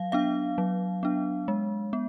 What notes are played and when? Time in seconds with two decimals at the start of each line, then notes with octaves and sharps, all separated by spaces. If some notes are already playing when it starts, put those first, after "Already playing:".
Already playing: F#3 F5
0.12 B3 D4 F5
0.58 F#3
1.03 B3 D4
1.48 G#3
1.93 B3